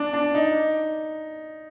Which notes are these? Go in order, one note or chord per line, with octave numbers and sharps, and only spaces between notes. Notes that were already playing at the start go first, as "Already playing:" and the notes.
Already playing: D4
D4
D#4